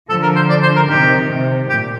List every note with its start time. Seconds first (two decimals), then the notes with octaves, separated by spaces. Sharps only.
0.09 D3 F3 A4
0.22 A#4
0.36 C5
0.49 D5
0.62 C5
0.75 A#4
0.89 C3 D#3 G4
1.29 C3
1.69 A#2 G4